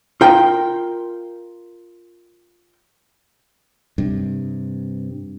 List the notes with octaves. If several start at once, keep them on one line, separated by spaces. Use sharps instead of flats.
F4 A#4 G5
G2 C3